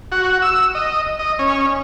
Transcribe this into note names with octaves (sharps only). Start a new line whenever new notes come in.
F#4
E6
D#5
D#5
C#4